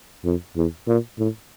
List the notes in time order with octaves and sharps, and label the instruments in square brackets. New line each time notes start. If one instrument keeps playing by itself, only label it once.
[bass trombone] F2
E2
A#2
A2